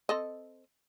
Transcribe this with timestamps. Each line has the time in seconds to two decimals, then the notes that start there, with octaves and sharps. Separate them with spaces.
0.09 C4 A4 D#5